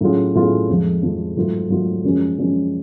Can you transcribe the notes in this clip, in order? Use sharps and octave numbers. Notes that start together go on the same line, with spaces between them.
A2 F#3 C#4 F4 G#4
A2 F#3 C#4 F4 G#4
F2 F3 G#3
F2 F3 G#3
G#2 F#3 A3 F4
G#2 F#3 A3 F4
F#2 F3 G#3 C#4
F#2 F3 G#3 C#4